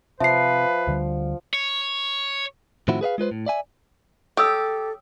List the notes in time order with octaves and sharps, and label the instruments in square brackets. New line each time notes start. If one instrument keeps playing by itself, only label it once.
[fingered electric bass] C3 [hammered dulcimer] F3 [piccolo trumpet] B4 [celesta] E5 C7
[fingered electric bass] D2 D3 G3
[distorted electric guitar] C#5
[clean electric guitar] A2 D#3 F3 C4 E4 F#4
G#4 B4 D#5 F5
G#3 F4 B4 C5
A2
D5 E5 G#5
[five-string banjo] G4 [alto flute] A4 [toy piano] C#5 D#6 E6